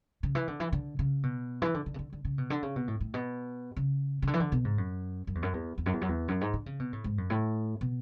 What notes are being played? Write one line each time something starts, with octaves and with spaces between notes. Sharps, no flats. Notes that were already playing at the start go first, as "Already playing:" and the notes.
C#3
E3
D3
E3
D3
C#3
B2
E3
D3
D3
C#3
D3
D3
C#3
B2
D3
C#3
B2
A2
A2
B2
C#3
C#3
D3
E3
D3
B2
G#2
F#2
F#2
E2
F#2
E2
E2
F#2
E2
F#2
E2
F#2
G#2
D3
C#3
B2
A2
G#2
F#2
A2
B2